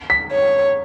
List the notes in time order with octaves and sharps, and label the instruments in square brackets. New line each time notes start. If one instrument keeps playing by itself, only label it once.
[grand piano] B6
[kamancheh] C#5